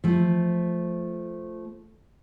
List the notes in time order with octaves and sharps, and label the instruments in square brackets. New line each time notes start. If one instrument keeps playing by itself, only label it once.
[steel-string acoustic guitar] F3 A3